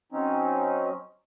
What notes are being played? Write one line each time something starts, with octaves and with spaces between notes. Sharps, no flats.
F#3 C4 C#4 D#4